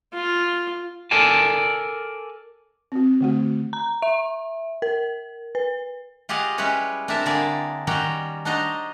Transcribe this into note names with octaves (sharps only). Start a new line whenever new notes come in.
F4
A4 A#4 D5 G#5 A5
C4 F#4
D3 A3 F#4
A#5
E5
A#4
B4
F4 G4 G#4 D#5 F5 F#5
G3 G#3 C#4 E4 B4 C#5
C4 D4 E4 A#4 E5 A5
D3 A#3 G#4 A#4 D5 E5
D#3 G3 C#4 F#4 G5 A#5
D4 D#4 F#4 C5 D#5 A#5